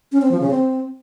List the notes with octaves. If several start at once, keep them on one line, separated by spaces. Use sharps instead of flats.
C#4
C4
F3
C#3
C4